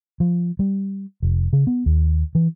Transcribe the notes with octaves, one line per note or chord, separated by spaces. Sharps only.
F3
G3
F1
C#3
B3
D#2
E3